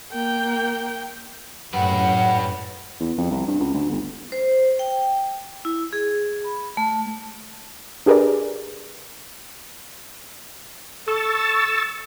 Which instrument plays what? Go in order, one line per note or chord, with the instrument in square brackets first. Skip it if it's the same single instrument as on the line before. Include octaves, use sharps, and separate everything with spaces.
[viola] A#3 G5
[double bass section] F#2 A2 [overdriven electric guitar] G4 B4 [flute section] F#5
[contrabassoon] E2
F2
C2
G2
C#2
D2
G1
[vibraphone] C5
G5
E4
G#4
B5
A3
[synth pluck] D4 G4 G#4 A#4 B4 D5
[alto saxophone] A4 [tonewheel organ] C#6 E6 A6